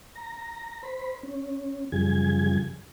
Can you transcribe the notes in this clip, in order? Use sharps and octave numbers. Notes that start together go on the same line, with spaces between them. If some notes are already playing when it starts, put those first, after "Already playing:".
A#5
C5 B5
C#4
F#2 C#3 F3 G3 G#4 G#6